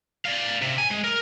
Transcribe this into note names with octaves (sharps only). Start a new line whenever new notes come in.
D5 F5
C3
G#5
G#3
A#4